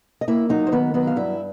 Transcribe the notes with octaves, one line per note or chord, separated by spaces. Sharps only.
D#5
A#3 E4 E5
F#3 D#4 D#5
C5
D#3 B3 B4
F#3 B3 B4
F5
G2 E4 E5